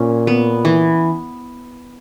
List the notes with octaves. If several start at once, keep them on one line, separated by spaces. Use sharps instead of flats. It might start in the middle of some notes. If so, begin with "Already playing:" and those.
Already playing: A#2 C#4
B3
E3